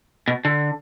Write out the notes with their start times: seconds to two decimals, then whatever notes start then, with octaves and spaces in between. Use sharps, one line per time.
0.28 B2
0.45 D3